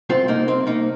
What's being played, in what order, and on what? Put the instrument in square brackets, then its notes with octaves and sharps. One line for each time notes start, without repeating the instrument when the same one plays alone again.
[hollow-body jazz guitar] C2 C4 F4
A#3 D#4
C2
C4
C2
A#3 D#4